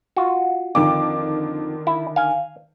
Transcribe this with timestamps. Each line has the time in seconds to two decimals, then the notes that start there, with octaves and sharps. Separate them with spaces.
0.17 F4 F#4
0.75 F2 D3 D#3 D6
1.87 E4
2.16 F5 G#5